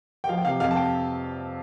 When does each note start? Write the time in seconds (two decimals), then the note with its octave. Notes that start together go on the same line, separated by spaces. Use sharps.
0.24 G5
0.29 F3 F5
0.37 G5
0.45 C3 F5
0.60 F2 F5
0.71 A5
0.76 G5